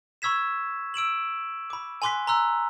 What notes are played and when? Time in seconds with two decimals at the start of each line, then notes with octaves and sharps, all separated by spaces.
0.22 B5 C#6 E6 G#6 B6 E7
0.94 E6 D7 E7 F#7
1.70 B5 D6
2.02 G#5 B5 C6 D6 F#6 B6
2.27 A#5 C6 E6 F#6